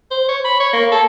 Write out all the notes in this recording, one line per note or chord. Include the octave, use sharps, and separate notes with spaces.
C5
C#5
B5
C#5
A#3
A4